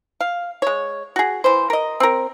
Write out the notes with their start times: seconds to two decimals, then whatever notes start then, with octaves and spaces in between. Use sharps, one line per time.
0.21 F5
0.62 G#3 C#5
1.16 F#4 G#4
1.44 E3 C5
1.70 A#4 D#5
2.00 C4 A#4